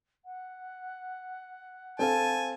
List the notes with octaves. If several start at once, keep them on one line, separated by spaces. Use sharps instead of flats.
F#5
C4 A4 F5 G#5 A5